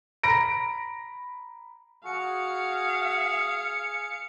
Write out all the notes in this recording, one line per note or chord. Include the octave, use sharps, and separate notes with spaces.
A#5 B5 A#6 D7
F#4 G#4 F5 C#7